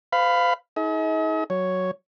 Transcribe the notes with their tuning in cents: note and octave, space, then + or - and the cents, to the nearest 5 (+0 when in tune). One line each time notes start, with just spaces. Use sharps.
C5 -40 F5 +0 B5 +15
D#4 +40 G#4 +40 D#5 +45
F#3 +0 C#5 +0